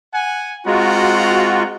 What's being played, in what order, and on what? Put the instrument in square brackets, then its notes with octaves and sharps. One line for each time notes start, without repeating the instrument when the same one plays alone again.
[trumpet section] F#5 G#5
[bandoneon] G#3 [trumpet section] C4 F#5 A#5 [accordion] F4 F#4